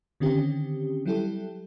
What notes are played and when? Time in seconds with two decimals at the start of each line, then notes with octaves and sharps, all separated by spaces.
0.20 D3 D#3 C4 C#4 G4
1.06 F#3 G3 E4 G4 A4